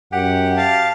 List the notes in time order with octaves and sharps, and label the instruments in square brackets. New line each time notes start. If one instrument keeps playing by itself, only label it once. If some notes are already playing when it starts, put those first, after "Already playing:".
[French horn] F#2 [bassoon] G4 [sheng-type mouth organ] F#5
[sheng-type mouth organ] F5 A5